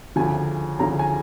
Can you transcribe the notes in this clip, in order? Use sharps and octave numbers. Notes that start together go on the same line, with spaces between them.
D2 C#3 F3 G#5
D2 C#3 F3 A#5
G#5